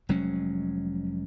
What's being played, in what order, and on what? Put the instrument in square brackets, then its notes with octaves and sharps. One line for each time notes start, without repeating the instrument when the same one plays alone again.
[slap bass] F1 F#3 G#3 C#4